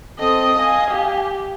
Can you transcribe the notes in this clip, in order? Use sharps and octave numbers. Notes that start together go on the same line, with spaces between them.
C4 A4 D#5 D#6
F5 G#5
G4